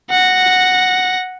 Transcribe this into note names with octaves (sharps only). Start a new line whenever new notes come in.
F#5 A#6